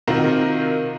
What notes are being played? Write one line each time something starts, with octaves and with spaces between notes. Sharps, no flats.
C3 D#3 C4 F4 F#4 A#4